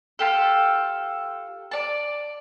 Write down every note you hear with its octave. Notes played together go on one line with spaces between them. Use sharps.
F4 G4 A4
D5 A5